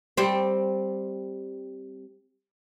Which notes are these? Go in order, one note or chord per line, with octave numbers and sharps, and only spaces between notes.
G3 C4